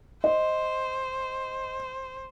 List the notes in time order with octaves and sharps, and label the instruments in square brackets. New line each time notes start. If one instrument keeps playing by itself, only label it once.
[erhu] C5 [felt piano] D#5